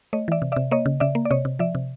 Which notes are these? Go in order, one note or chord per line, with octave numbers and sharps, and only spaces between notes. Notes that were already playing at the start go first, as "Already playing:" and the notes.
A3 C#5 D#5
E3 D5 E5
C3
C3 D5 E5
A#3 C#5 D#5
C#3
C#3 D5 E5
A#3
D5
C3 C#5 D#5
C3
F3 D5 E5
C3